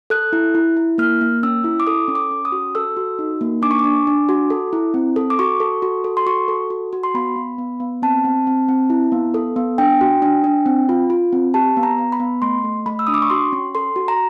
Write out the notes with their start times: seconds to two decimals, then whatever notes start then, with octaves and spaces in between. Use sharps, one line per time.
0.10 A4 F#6
0.33 E4
0.55 E4
0.77 E4
0.98 A#3 F6
1.21 A#3
1.43 C#4 E6
1.64 E4
1.80 D6
1.87 A4 D#6
2.08 C#4
2.15 D6
2.31 C#4
2.45 D#6
2.52 F#4
2.75 A4 E6
2.97 F#4
3.19 D#4
3.41 A#3
3.62 D4 D6
3.71 C#6
3.79 D4 D6
4.07 D4
4.29 F#4
4.50 A4
4.73 E4
4.94 C4
5.16 A4
5.30 D6
5.39 F#4 C#6
5.60 A4
5.82 F#4
6.04 A4
6.17 C6
6.26 F#4 C#6
6.48 A4
6.70 F#4
6.93 F#4
7.03 C6
7.14 B3 B5
7.36 B3
7.58 B3
7.80 B3
8.02 C4 A5
8.25 C4
8.47 C4
8.68 C4
8.90 E4
9.12 B3
9.34 A4
9.56 B3
9.78 D4 G5
10.01 F#4
10.22 D4
10.44 D4
10.66 C4
10.89 F4
11.10 F4
11.33 C4
11.54 G4 A5
11.77 B3
11.83 A#5
11.98 B3
12.12 B5
12.20 B3
12.42 A3 C6
12.64 A3
12.86 A3 B5
12.99 E6
13.07 D4 D#6
13.14 D6
13.22 C#6
13.30 F#4 C6
13.53 C#4
13.75 A4 C6
13.96 F#4
14.08 A#5